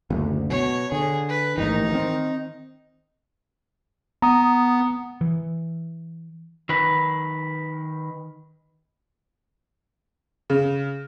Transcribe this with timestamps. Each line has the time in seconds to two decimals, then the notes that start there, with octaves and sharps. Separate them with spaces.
0.10 F#1 D2
0.50 B2 C#5
0.92 D3 G#4
1.29 B4
1.58 A1 G#2 D#3 D#4
1.92 D#3 C4
4.22 B3 A#5 D#6
5.21 E3
6.69 D#3 B4
10.50 C#3